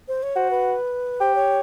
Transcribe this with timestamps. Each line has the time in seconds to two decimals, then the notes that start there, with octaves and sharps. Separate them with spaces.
0.08 C5
0.23 C#5
0.36 F#4 C5
0.51 B4
1.21 G4 C5
1.35 C#5